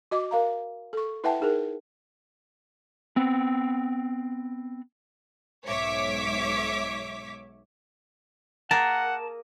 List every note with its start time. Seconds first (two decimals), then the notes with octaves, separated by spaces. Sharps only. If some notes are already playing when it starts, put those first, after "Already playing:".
0.11 F#4 D#5 D6
0.31 A#4 F5 A#5
0.93 A4 C#6
1.24 E4 B4 E5 F#5 G5 A5
1.40 D#4 G#4 A#4
3.16 B3 C4
5.65 B1 G#2 C#5 E5 D6 B6
8.71 A#3 G#4 A#4 F#5 A5